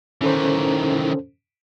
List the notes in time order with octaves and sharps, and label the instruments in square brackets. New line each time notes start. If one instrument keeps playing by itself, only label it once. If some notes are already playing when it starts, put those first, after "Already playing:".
[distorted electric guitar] D#3 E3 [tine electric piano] C#4 A4 C5